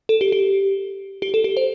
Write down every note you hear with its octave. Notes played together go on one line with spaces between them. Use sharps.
A4
G4
G4
G4
A4
G4
C5